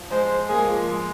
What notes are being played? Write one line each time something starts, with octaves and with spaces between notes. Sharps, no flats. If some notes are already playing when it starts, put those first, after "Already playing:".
Already playing: F3
G#3 C5
A#3 G#4
G#3
F3 A#3
G#3